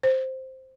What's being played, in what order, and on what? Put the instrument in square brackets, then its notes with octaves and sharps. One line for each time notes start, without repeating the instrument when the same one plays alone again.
[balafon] C5